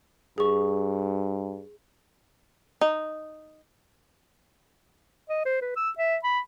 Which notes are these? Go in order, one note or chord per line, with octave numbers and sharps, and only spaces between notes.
G2 G#4 C#6
D#4
D#5
C5
B4
E6
E5
B5